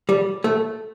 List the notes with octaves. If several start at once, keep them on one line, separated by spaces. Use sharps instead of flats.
G3
A3